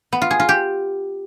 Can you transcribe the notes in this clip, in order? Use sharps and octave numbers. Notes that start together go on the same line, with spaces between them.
B3
F4
G#4
F4
G4